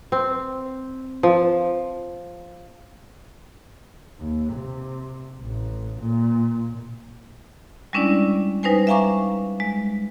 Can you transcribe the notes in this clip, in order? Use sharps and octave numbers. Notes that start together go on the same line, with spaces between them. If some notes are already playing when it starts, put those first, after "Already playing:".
C4
F3
D#2
C3
A1
A#2
G3 G#3 C#4 D4 E4 D5
G3 D#4 B4 C5 G#5
E5 F5 G#5 A#5 C#6 D6
G#3